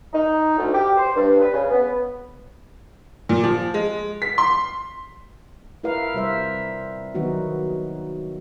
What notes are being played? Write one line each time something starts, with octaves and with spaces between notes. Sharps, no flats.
D#4
D2
G4
C5
G2
B4
C#3
B3
A#2
F3
G#3
B6
C6
E4 A#4 B4 F5
C3 G3 C5 E5
D#3 F#3 B3 D#4 F#4